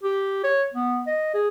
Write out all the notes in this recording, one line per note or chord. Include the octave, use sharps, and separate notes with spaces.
G4
C#5
B3
D#5
G#4